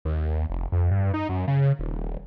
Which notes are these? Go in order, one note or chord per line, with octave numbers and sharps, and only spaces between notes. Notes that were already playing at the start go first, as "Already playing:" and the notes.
D#2
F1
F2
G2
D#4
F#2
C#3
D#1